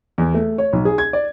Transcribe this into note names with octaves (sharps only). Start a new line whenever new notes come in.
E2
A3
C#5
B1
G#4
G#6
D5